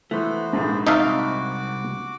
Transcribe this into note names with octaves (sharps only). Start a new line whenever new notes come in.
E3 A3 B3 F#4 C5
A#1 G#2
C2 C4 D#4 F#4 E5 F5 A5 D6